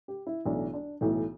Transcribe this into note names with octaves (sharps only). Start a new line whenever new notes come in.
G4
E4
B1 A2 E3 D4
D4
B1 A2 E3